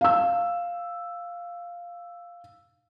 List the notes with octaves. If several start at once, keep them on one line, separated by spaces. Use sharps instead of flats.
F5 E6